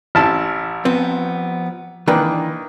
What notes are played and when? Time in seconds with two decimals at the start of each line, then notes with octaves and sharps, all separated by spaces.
0.15 A1 E4 A5
0.85 F3 B3 C4
2.08 D#3 E3 A#3 D4 B4